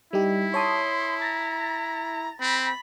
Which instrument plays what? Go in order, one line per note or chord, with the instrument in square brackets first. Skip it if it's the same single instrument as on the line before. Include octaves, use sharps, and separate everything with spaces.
[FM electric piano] G3 D#4 G4 [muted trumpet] E4
[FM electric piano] C#5 A5 D#6 [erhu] C6
[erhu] A#5 [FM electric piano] A6 A#6
[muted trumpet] C4 [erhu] B5